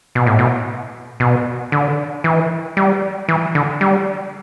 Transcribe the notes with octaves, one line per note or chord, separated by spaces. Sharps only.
B2
A2
B2
B2
D3
E3
G3
E3
D3
G3